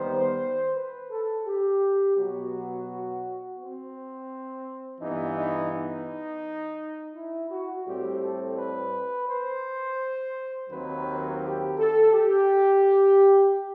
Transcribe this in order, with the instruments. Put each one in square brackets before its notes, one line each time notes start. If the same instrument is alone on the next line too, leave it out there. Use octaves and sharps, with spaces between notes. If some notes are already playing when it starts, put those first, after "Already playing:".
Already playing: [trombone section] D#2 D#3 G3 B3 C5
B4
A4
G4
B2 F#3 B3 F#4
C4
G2 E3 B3 D#4
D#4
D#4
E4
F#4
A2 G3 C4 G4
A4
B4
C5
D#2 D#3 F#3 C4 B4
G4
A4
G4